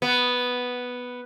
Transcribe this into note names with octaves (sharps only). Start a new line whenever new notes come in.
B3